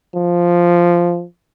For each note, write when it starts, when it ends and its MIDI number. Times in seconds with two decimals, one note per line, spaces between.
0.16 1.24 53